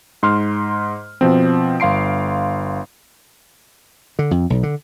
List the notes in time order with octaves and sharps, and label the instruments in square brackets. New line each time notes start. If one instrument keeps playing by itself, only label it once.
[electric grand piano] G#2 C6 F6
B2 F3 C4
G1 F5 C6 C7 D7
[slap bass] D3
F2
B1
D3